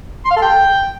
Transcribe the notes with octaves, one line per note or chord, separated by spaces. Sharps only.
C6
F5
A4
G5